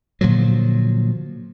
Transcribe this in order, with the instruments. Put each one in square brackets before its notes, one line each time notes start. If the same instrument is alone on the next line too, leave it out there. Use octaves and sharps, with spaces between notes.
[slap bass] A#2 D3 F3 F#3